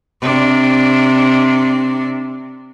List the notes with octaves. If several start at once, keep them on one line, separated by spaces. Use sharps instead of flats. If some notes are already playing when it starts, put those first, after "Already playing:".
C3 D4